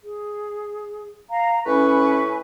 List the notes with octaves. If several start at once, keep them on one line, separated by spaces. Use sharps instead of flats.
G#4
F5 A#5
A2 C#4 B4 G#5 B5 C#6